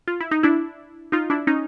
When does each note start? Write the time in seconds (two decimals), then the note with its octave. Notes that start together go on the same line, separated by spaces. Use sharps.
0.08 F4
0.21 E4
0.31 D#4
0.43 D4 E4
1.12 D#4 F4
1.30 D4 E4
1.47 C#4 D#4